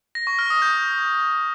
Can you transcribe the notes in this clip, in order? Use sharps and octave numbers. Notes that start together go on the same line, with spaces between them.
A#6
C#6
F6
D#6
G6